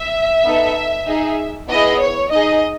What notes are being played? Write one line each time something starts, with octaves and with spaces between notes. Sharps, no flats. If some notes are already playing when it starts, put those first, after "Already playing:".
Already playing: E5
B3 D#4 A4
D#4 G#4
B3 E4 G#4 D#5
C#5
D#4 G#4 D#5